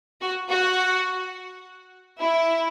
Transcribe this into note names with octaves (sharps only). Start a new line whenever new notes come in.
F#4
F#4
E4